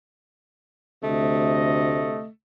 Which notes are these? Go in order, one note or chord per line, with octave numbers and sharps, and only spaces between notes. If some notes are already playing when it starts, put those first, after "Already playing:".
D2 C3 A3 D#5